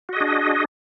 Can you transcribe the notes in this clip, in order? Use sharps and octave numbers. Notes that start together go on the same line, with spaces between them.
D4 F#4 G#4 D#5